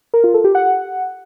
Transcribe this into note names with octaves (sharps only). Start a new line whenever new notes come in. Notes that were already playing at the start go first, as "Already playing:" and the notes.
A#4
F4
A4
G4
F#5